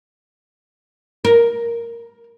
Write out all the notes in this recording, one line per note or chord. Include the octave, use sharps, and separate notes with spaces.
A#4